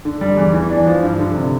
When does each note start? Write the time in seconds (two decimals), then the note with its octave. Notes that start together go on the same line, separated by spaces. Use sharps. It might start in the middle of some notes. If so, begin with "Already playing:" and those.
0.05 D3
0.21 G3
0.37 E2
0.53 E3
0.70 D4
0.86 F3
1.03 G2
1.19 D3
1.35 C3